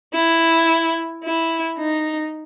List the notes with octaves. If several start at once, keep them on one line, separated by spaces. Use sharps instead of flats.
E4
E4
D#4